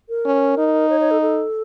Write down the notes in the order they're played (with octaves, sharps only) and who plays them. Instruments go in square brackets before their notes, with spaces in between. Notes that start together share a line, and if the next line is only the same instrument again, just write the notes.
[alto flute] A#4
[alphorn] C#4
D#4
[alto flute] C#5
C#5
A4
A4